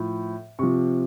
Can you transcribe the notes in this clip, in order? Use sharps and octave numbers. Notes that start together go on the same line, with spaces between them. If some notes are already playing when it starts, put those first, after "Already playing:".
Already playing: A2 F3
C3 F3 C#6